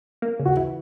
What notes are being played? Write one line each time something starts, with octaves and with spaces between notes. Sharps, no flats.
A#3
C#3
F#4
E3